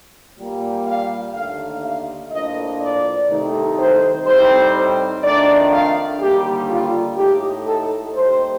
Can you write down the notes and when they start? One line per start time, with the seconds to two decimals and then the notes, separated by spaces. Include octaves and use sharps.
0.38 A#2 G3 A#3
0.87 F5
1.34 D#2 D3 A3 F5
1.84 F5
2.32 A2 F3 A#3 D4 D#5
2.80 D5
3.29 C2 C3 D#3 A3 D#4
3.78 C5
4.26 A2 G3 C4 D#4 C5
5.23 F2 D#3 A3 D4 D5
5.72 F5
6.19 D#2 D3 G3 A#3 G4
6.69 F4
7.17 A2 A3 D#4 G4
7.65 A4
8.14 D#2 D#3 G3 C5